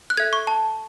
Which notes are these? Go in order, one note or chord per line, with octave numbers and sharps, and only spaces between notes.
F#6
A4 E5 G#6
C#6
A5